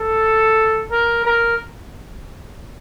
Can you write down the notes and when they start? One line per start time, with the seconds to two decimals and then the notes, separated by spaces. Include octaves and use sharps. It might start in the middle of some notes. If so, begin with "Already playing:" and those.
Already playing: A4
0.91 A#4
1.25 A#4